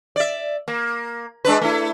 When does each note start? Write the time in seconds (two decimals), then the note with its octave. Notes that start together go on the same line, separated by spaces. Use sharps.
0.16 D5 E5
0.68 A#3
1.45 G#3 D4 B4
1.61 A3 E4